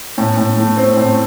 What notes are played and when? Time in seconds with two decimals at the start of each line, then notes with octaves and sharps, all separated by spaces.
0.18 A2
0.37 A2
0.57 A3
0.77 C4
0.97 A2